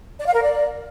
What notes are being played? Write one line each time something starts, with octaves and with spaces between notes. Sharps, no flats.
D5
F5
A#4
D5